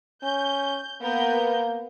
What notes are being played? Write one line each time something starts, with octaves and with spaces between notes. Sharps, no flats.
C#4 G6
A#3 B3 A#4 G6